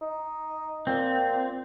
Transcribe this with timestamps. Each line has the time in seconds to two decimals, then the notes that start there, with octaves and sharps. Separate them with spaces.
0.01 D#4
0.87 A#2 C4